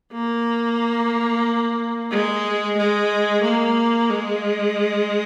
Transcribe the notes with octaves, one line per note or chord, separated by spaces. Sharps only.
A#3
G#3
G#3
A#3
G#3